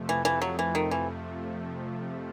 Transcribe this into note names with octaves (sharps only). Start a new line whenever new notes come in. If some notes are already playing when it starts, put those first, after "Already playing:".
Already playing: F2 C3 F3 A3
E3
E3
F#3
E3
D#3
E3